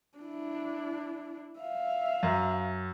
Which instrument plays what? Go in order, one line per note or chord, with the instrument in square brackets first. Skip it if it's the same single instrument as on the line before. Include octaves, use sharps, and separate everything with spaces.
[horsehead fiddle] D4 E4
E5 F5
[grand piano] F#2